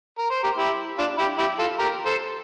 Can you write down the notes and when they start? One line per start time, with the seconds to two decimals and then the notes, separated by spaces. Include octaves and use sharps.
0.18 A#4
0.30 C5
0.43 G4 A#4
0.58 E4 G4
0.98 D4 F4
1.18 E4 G4
1.38 E4 G4
1.59 F4 A4
1.79 G4 A#4
2.06 A4 C5